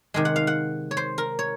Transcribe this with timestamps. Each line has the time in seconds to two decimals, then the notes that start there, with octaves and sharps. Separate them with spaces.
0.14 C3 D#3 G#3
0.25 F#5
0.36 F5
0.47 F#5
0.91 C#5
0.97 C5
1.18 A#4
1.39 C#5